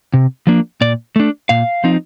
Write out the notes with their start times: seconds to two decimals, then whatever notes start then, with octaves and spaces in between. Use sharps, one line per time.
0.14 C3
0.47 F3 A#3 D4
0.81 A#2 D5
1.16 A3 D4
1.49 A#2 F5
1.84 F3 C4 D#4